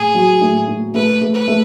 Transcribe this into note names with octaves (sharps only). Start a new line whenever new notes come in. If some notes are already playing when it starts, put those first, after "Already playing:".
Already playing: A2 G#4
F#3
A2
A2
A3 B4
A3
B4
A3